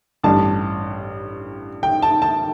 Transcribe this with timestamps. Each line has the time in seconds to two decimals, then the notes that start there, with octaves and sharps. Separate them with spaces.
0.23 A1 G2 G3 D4 A5
1.83 G5
2.02 A5
2.22 A5